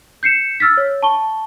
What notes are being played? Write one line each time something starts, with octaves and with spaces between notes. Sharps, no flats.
G6 C7 C#7 E7
E6 F6 A6 B6
C#5
A5 C#6 G7